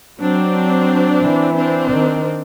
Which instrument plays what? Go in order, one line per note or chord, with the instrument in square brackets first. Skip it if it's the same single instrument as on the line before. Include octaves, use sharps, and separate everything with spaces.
[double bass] F#3 [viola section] C4 D4
[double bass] E3
[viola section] C4 D4
[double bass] D#3